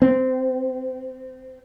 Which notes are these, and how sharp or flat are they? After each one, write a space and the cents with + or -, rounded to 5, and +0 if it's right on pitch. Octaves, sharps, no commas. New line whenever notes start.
C4 -20